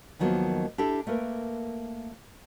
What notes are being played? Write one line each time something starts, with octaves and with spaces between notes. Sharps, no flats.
D#2 D#3 F3 F#3 A#3 B3
D4 E4 G4 A4 E5
A3 A#3 A#4 B4